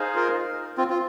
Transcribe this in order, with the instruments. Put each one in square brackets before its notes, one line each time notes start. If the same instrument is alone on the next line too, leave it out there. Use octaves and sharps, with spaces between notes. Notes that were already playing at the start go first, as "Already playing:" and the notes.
Already playing: [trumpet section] D#4 G#4 C5 F5
[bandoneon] F4 A#4
C4 F4
F4